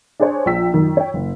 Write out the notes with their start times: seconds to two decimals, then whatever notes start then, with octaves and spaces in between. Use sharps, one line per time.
0.20 D4 G#4 C5 C#5
0.46 A#1 F3 G5 E6 B6
0.74 F#2 D#3
0.97 C#5 G5
1.14 F#1